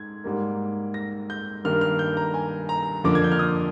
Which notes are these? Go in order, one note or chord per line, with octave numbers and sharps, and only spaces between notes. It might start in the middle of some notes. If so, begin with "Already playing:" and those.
Already playing: G#2 G#6
G#2 G3 A#3
A#6
G6
G2 D#3 A#3 F6
F6
G6
A#5
G#5
A#5
F2 D3 F3 A#3 D6
G#6
G6
F6
D#6